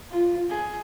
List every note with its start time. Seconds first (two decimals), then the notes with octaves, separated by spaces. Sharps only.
0.11 F4
0.50 G#4